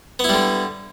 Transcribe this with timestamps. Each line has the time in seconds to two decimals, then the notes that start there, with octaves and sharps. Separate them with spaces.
0.19 B3
0.24 E4
0.29 G3
0.34 D3